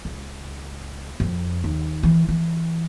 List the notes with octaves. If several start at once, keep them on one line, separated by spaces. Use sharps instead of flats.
C#2
F2
D#2
E3
E3